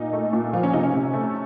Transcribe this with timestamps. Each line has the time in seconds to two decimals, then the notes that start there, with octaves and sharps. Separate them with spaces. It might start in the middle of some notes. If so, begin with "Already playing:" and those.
Already playing: A#2 D#4
0.13 A3
0.33 A#2
0.53 F3 F4
0.63 C#4
0.73 C3 D#4
0.83 C#4
0.94 C3
1.14 A3